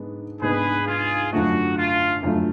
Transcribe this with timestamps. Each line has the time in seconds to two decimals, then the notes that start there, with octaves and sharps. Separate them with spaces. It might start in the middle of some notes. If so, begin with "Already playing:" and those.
Already playing: G#2 G#3 B3 D4
0.42 G#2 G#3 B3 D4 G#4 B4
0.87 F4 G#4
1.32 F#2 D3 F3 A3 F#4
1.78 F4
2.23 F#2 D3 F3 A3